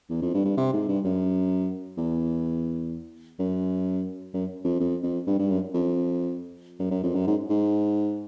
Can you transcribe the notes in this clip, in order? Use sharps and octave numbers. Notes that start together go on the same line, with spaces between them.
E2
F2
G2
G2
C3
G#2
G2
F#2
E2
F#2
F#2
F2
F2
F2
G2
G2
F#2
F2
F#2
F#2
F2
F#2
G#2
G#2